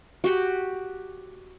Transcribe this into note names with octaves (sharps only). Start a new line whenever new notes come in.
F#4 G4